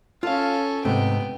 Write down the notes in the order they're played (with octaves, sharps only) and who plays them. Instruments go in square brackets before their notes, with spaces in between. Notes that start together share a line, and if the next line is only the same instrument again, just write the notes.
[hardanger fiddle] C#4 A4 [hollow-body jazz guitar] F4 F5
[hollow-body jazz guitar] G#2 C3 A3 [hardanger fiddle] B3 G5